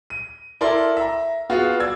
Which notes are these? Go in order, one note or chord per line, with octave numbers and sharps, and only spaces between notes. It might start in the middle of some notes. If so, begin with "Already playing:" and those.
D#7
E4 A4 A#4 D5 C6
E5 A#5
B3 F4 F#4 G#4
D5 E6 G#6